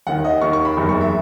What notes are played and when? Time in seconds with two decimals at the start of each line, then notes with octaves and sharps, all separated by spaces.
0.07 D#2 D#3 F#5
0.24 D#5
0.41 D#2 D#3 C#6
0.53 C#6
0.65 B5
0.77 F#1 E2 D#3
0.89 C#6
1.01 E5